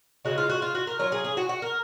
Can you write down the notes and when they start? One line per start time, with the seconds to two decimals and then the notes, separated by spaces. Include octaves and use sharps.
0.25 C#3 G#3 D#4 F#4
0.38 F4
0.50 F#4
0.62 F4
0.75 F#4
0.87 A#4
0.99 F#3 C#4 F4 A#4
1.12 G#4
1.25 G#4
1.37 F#4
1.49 F#4
1.62 A#4